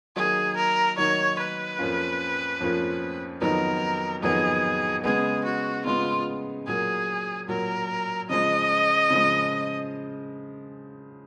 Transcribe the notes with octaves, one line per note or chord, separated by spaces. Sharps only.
D#3 F#3 A#3 D#4 G#4
A#4
D#3 F#3 A#3 D#4 C#5
B4
F2 F3 A#3 C#4 F4
F2 F3 A#3 C#4 F4
F2 D#3 F#3 B3 D#4 A#4
F2 D#3 F#3 B3 D#4 G#4
C#3 G#3 B3 G#4
F#4
C#3 G#3 B3 F4
A#2 F#3 A#3 G#4
A#2 F#3 A#3 A#4
C#3 F3 G#3 D#5
C#3 F3 G#3